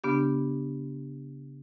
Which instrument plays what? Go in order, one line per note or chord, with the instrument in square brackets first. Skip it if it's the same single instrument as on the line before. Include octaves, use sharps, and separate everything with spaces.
[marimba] C#3 B3 D4 G4